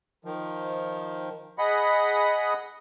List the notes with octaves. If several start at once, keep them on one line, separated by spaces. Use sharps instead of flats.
D#3 F3
G#4 D#5 F#5 B5